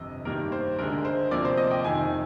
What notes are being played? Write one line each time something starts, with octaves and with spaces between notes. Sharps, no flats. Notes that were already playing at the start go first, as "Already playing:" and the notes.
Already playing: G1 F2 C3 D#5
G2 D#3 G3 A#3 A#4
C5
D2 D3 G#3 A#4
C5
D2 C3 F3 A#3 D5
C5
D#5
G5
F2 C3 D#3 G#5